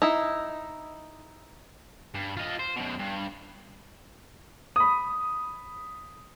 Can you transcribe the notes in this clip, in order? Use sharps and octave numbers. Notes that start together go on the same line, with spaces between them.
D#4 E4
G2
F4 D#5
C5
F#2 B2
G2
B5 D#6